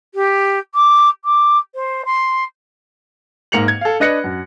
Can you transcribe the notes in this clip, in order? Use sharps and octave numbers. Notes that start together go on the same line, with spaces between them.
G4
D6
D6
C5
C6
G#2 A#3 C#7 F7 F#7
G#6
A4 F5
D4 B4 D#5 F#6 A#6 C#7
F#2